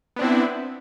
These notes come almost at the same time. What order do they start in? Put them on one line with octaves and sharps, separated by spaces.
B3 D4 C4 E4